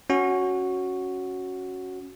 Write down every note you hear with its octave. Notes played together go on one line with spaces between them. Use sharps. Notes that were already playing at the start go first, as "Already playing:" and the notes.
C#4 F#4